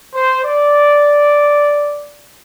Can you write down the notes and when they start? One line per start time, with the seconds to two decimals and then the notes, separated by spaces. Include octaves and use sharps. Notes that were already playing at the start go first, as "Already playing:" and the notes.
0.15 C5
0.45 D5